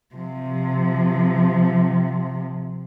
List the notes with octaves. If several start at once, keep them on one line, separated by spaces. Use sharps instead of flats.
C3 F3